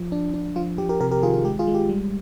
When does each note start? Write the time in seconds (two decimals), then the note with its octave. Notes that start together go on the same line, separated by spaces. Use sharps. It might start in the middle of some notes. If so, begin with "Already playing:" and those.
Already playing: F3
0.12 D4
0.34 D4
0.56 F3 F4
0.78 F3 G4
0.89 G4 A#4
1.00 C3 G4 A#4
1.11 G4 A#4
1.22 D#3 F4 G#4
1.34 F4
1.45 G#3 G4
1.59 F4 G#4
1.67 G#3
1.75 G4
1.89 G3